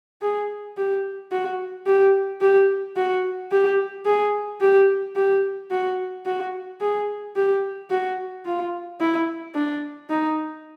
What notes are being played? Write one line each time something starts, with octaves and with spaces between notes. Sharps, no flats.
G#4
G4
F#4
G4
G4
F#4
G4
G#4
G4
G4
F#4
F#4
G#4
G4
F#4
F4
E4
D4
D#4